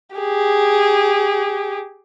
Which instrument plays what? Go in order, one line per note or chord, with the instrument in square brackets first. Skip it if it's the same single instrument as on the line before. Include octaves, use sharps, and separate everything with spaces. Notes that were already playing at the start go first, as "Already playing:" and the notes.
[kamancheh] G4 G#4